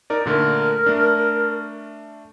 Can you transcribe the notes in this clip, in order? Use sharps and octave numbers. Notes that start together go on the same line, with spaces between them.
D#4 A#4 D5
A#2 D3 A3 A#4
A3 D4